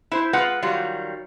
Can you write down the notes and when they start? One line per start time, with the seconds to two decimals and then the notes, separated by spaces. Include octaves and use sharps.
0.11 E4 C5
0.33 G#3 F4 B4 F#5
0.62 D#3 F#3 G3 F4